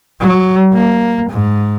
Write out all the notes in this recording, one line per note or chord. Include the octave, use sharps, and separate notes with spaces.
F#3
A#3
G#2